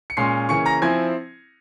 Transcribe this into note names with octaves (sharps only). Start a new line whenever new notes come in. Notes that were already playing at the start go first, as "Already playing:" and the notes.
C#7
A#2 G#3 C#4 C6 C7
C#3 E3 A#3 C#4 C#6 C#7
A#5 A#6
F3 C4 E4 G#5 G#6